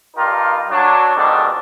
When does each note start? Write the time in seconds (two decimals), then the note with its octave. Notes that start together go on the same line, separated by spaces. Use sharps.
0.16 G2 G3 D#4 F4 G4 A#4
0.70 F#3 D4
1.16 F2 G#2 B2 D3 D#3 D4